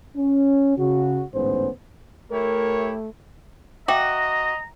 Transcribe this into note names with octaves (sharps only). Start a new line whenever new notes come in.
C#4
C#3 F#4
A1 D2 G#2 B3 C#4 C5
A3 E4 G4 A#4 C#5
F#4 D#5 E5 G5 A#5 D6